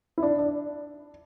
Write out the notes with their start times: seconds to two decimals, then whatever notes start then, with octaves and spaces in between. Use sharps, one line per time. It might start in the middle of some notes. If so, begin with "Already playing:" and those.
0.18 E4
0.23 D4
0.39 D4